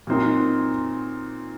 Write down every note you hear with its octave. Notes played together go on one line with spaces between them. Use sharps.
A#2 F#3 C4 D#4 A#4